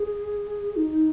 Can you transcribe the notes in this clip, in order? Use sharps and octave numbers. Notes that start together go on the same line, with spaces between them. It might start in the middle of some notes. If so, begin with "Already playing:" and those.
Already playing: G#4
D#4